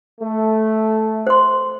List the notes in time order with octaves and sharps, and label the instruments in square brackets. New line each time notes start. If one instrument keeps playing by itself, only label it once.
[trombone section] A3
[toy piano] C5 C6